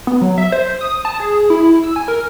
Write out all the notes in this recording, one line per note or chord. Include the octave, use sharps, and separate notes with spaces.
B3
F#3
E5
C5
D#6
A5
G#4
E4
E6
G#5
A#4